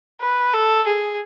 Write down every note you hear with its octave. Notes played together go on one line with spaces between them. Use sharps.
B4
A4
G#4